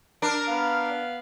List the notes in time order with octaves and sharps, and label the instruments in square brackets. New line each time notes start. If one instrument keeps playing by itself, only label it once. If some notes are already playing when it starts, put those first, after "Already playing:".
[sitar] D4 A#4
[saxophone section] B3 F5